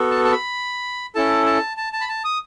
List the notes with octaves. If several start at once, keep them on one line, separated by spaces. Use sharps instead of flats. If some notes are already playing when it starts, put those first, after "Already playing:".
Already playing: B3 F#4 A4
A5
A5
B5
C#4 E4 A4 A5
A5
A5
A5
B5
A5
D#6